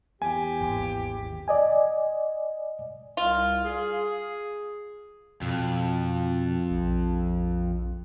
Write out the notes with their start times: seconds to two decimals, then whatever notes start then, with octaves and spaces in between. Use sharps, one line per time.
0.22 E2 G4 G#5
0.61 G#1 D#2
1.48 D5 D#5 G#5
3.17 C2 F4
3.64 G#4
5.42 F2 B2
6.71 A#1